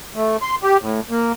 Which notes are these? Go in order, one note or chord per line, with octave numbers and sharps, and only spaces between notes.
A3
C6
G4
A2
A#3